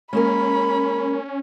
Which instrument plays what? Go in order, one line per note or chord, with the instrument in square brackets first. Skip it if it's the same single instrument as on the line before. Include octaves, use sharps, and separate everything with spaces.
[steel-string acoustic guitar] G#3 A#3 A#4 [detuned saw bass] C#4 [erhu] B5